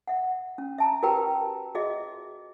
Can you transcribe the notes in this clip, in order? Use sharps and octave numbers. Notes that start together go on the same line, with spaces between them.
E5 F#5
C#4
E5 A5 A#5
F#4 G4 A#4 B4 G5 A#5
F#4 G#4 D#5 E5